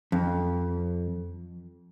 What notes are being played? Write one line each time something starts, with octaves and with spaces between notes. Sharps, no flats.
F2